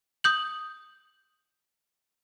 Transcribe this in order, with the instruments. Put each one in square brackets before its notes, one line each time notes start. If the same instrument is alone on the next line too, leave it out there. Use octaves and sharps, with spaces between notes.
[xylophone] D#6 G6 F#7